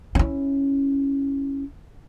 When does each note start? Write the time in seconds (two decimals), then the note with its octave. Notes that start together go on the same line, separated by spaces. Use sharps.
0.15 C#4 E4